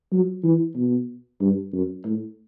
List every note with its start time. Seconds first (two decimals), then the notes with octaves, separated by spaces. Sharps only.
0.12 F#3
0.44 E3
0.76 B2
1.41 G2
1.73 F#2
2.05 A2